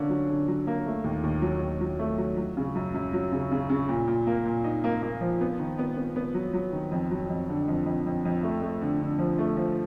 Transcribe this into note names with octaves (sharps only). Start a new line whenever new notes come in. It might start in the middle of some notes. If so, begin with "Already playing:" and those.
Already playing: D3 A#3 C#4
F#3
D3
F#3
A#3
A3
D#2
D#2
F#3
D#2
F#3
A3
F#3
F#3
C#3
F#2
F#2
F#3
C#3
C#3
C#3
A#2
A#2
A#3
A#2
D#4
A#3
A#3
F3
B3
D#3
B3
B3
B3
F#3
F#3
D#3
F2
F#3
F2
D3
F2
F2
F2
F2
A3
A3
D3
D3
F3
A3
F3